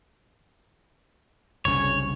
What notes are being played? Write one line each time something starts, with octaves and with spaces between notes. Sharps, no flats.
F#1 C2 C#3 C#5